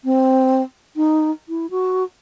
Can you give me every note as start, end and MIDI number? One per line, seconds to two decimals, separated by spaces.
0.05 0.62 60
0.96 1.31 63
1.49 1.70 64
1.70 2.04 66